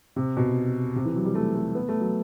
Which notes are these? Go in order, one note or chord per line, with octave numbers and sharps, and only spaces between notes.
C3
B2
C3
E3
F#3
G3
A3
A3
B3
A3
F#3